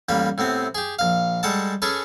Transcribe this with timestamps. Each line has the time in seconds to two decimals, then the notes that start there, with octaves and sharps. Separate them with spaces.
0.09 A1 G3 A#3 B5
0.38 A2 C3 B3 C4
0.75 G4 G#4
0.99 A#1 F5
1.43 G3 G#3 A4 F#5 A5
1.82 C#4 G#4 A4 B4